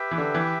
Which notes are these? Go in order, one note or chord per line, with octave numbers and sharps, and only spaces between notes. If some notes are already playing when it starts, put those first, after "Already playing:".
Already playing: G4 B4 E5 G5
E3
D3
E3